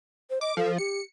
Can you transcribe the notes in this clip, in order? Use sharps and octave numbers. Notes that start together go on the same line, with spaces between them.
C5
D#5 D6
F3 A4
G4 C#7